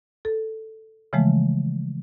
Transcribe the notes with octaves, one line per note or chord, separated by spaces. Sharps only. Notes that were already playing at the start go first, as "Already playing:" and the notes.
A4
C#3 E3 F3 G#3 A3